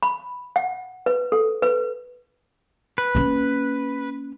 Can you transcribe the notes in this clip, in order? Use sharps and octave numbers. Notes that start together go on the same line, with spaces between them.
B5
F#5
B4
A4
B4
B4
A#3 C#4